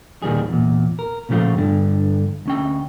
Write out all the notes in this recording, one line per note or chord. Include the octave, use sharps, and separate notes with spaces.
D#2 A#2 D#3 G3 G#4
E2 A#2
A#4
A#2 C#3 F3 A3 F4 F#4
G2 D3
D2 C#4 G5